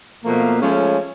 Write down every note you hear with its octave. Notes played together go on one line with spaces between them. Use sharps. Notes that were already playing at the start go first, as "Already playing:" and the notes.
B2 F3 A3 A#3
F3 G#3 A3 C#4